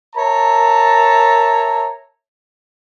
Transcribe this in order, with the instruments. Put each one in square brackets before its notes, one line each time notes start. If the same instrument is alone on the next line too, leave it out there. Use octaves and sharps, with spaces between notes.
[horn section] A#4 C#5 E5 A5 A#5